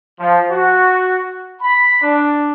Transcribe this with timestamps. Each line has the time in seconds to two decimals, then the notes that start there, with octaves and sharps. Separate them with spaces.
0.19 F3
0.50 F#4
1.61 B5
2.02 D4